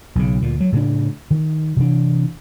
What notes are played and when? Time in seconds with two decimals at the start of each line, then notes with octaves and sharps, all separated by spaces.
0.15 B1 C#3
0.40 D2 A#2
0.61 F#3
0.72 A2 C#3 E3 D4
1.30 D#3
1.76 C3 E3 D4